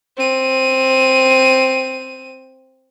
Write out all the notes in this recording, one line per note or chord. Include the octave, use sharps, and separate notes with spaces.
C4 D#7